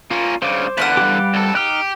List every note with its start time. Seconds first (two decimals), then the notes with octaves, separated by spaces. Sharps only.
0.11 A#3 C#4 F4
0.42 G2 C#3 C5 D6
0.78 E2 D3 B4 F5 F#5
0.97 G3 G4
1.34 C2 A4
1.55 D#4 G4 F6 F#6